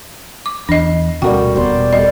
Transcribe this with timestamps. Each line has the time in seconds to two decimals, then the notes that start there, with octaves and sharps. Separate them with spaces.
0.46 D6
0.69 E2 D4 D#5
1.22 D2 B2 G3 A#3 C#4 F#4 G5
1.54 E1 B2 B3 G4 C5 D5
1.93 G3 G4 A4 D#5